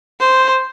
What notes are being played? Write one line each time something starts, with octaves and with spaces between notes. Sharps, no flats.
C5